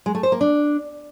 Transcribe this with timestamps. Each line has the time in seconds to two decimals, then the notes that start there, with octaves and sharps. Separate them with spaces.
0.06 G#3
0.15 A3
0.23 C5
0.32 A#3
0.41 D4